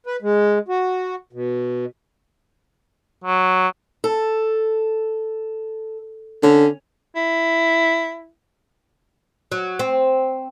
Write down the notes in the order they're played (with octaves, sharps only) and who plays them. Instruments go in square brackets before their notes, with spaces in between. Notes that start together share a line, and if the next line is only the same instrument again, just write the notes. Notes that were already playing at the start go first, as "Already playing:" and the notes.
[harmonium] B4
G#3
F#4
B2
[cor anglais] F#3
[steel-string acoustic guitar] A4
[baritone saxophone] D3 [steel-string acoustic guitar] C#4
[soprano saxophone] E4
[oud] F#3
C4